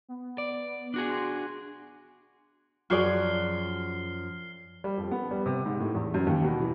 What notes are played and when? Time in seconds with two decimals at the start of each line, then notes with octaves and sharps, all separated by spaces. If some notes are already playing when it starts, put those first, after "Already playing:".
0.08 B3
0.38 D5
0.94 D4 F#4 G#4
1.07 C6
2.90 F#2 F3 F#4 G#4 D5 F6 C7 G7
4.84 G3
4.98 F2
5.11 B3
5.31 G3
5.46 C3
5.66 G#2
5.80 A2
5.95 E2
6.14 F#2
6.27 D#2
6.44 B2
6.60 E3